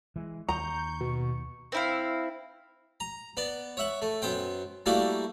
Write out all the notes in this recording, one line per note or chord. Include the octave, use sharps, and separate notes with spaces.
E3 G#3
D#2 A#5 C#6 G6
B2
C4 E4 F5
A#5
B3 D5
C#5 E5 F#5
A3
F#2 B3 C5 G5
G3 A3 A#3 E4 F#4 G4